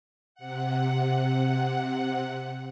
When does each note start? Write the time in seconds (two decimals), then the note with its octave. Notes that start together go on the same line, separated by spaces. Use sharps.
0.35 C3 F#5